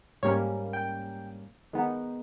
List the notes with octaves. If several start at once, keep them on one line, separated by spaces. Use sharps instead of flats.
G#2 G3 A#3 C#4 C#5
G5
D#3 G#3 B3 D#4